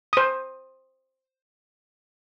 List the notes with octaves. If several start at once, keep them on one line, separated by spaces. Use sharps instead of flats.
C5 D#6